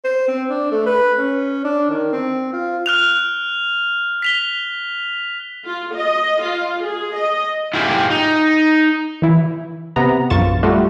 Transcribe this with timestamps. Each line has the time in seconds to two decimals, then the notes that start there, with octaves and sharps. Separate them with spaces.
0.04 C5
0.28 C4
0.49 D4
0.72 A3
0.86 B4
1.18 C#4
1.64 D4
1.90 D#3
2.12 C4
2.53 F4
2.86 F6 F#6 F7
4.22 B6 F7 G7
5.65 F4
5.95 D#5
6.42 F4
6.84 G#4
7.16 D#5
7.74 E4 F4 G4 G#4
8.10 D#4
9.22 E3 E4
9.96 C3 B3 A#5
10.30 A#1 F#2 F4 C#6 A6 E7
10.63 G3 A3 F4 F#4